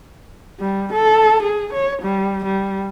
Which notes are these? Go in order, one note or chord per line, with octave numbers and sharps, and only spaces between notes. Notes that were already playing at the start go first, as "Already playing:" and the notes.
G3
A4
G#4
C#5
G3
G3